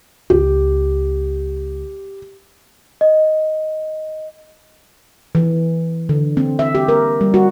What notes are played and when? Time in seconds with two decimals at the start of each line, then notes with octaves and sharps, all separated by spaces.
0.30 C#2 G4
3.01 D#5
5.35 E3
6.09 D3
6.37 C4
6.59 E5
6.75 G4
6.88 A#4
7.21 G3
7.34 F#4